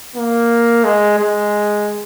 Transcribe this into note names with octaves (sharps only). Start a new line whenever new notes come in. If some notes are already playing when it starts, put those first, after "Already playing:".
A#3
G#3
G#3